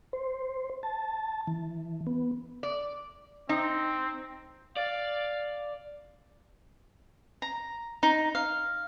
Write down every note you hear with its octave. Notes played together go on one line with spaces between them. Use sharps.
C5
A5
E3
B3
D5
C4 D#4
D5 F5
A#5
D#4
F5